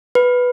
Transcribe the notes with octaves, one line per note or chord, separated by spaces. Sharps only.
B4